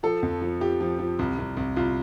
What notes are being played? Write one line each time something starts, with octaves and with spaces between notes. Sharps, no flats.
F3 A4
F2
F3
F3 G4
F3
F3
C2
C2
C2
C2 F4